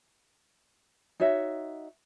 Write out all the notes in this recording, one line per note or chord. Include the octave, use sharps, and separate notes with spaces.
D#4 F#4 C#5 E5